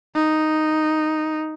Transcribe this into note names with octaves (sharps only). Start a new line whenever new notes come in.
D#4